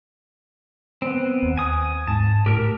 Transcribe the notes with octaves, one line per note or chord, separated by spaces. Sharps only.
B3 C4
D#2
G#5 D#6
G#2 A5
A2 G4 A#4